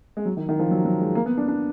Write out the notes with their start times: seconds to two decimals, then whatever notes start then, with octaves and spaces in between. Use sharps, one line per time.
0.17 G#3
0.26 F#3
0.37 D#3
0.49 D#3
0.59 F3
0.71 F#3
0.85 F#3
1.01 G#3
1.15 A#3
1.26 B3
1.38 D4
1.48 D4